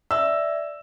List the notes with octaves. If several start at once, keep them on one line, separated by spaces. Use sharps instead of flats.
D5 E5 E6